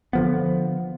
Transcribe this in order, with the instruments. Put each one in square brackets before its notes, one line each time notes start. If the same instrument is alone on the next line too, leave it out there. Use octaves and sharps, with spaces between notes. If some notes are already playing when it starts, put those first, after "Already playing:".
[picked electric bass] D3 F3 B3